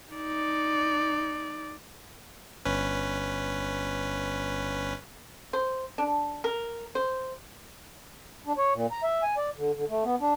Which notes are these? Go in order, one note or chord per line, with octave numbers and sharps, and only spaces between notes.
D#4 D5
G1 C#4 B4
C5
D4
A#4
C5
D4
C#5
A#2
A#5
E5
G#5
D5
D3
D3
A3
B3
D4